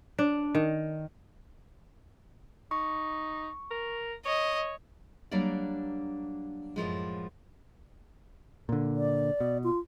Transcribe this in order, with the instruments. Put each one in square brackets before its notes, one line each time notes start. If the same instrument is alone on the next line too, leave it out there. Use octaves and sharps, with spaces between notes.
[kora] D4
D#3
[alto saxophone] D#4 [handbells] C#6
[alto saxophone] A#4
[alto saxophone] C#5 [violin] D#5
[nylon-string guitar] F#3 G3 A#3 D4 D5
F#2 A2 F3 G#3
[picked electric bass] A#2 D3
[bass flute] D5
[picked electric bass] B2
[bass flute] F4